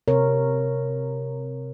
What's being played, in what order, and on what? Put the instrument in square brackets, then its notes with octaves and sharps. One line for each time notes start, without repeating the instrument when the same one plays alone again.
[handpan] C3 A#4 C#5